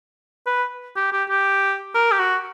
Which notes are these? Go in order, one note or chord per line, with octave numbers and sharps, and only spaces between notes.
B4
G4
G4
G4
A#4
G4
F#4